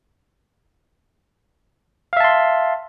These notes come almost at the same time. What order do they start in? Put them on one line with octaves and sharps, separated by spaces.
F5 E5 A5 C6